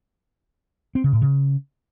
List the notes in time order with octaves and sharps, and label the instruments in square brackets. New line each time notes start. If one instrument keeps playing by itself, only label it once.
[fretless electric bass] C4
C#3
A2
C#3